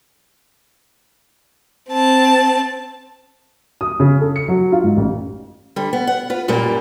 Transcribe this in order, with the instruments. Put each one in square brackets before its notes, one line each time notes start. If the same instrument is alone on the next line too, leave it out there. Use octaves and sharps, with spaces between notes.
[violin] C4 A5
[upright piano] D#6
C#3
A4
C#7
F#3
F4
G#2
A1
[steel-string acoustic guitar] D3 G3
B3
F#5
F4 B4
F#2 A#2 G3 A#3